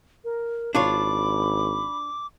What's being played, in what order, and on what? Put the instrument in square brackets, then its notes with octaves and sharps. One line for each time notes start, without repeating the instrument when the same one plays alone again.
[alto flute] A#4
[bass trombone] G#1 [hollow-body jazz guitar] D4 F4 C#5 [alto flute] B5 [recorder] D6